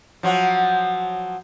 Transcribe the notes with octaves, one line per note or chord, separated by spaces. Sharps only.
F3 F#3 F#4